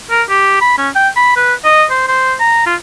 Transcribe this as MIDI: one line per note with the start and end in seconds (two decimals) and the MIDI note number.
0.10 0.23 70
0.29 0.58 67
0.61 0.76 83
0.78 0.89 61
0.96 1.08 79
1.16 1.36 83
1.37 1.54 71
1.64 1.85 75
1.90 2.05 72
2.08 2.34 72
2.40 2.66 82
2.66 2.75 65